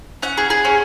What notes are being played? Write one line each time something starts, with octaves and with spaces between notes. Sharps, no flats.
C#4 F#5
G#4
G#4
C#4